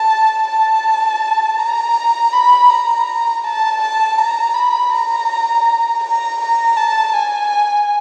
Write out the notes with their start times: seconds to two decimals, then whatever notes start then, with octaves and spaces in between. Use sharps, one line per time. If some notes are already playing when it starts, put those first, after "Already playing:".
Already playing: A5
0.48 A5
1.59 A#5
2.33 B5
2.70 A#5
3.44 A5
3.82 A5
4.18 A#5
4.54 B5
4.92 A#5
6.04 A#5
6.41 A#5
6.77 A5
7.13 G#5